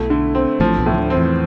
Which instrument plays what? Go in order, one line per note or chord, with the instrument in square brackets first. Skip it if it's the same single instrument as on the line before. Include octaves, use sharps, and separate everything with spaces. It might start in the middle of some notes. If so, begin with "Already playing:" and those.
Already playing: [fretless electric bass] B1 B2 [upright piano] A3 E4
[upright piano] D3
C4
[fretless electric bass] A1 A2 [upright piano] F3
[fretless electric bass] B1 B2
[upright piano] A2
[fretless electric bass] E3
D2 D3
[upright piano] C4
[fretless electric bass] E2 E3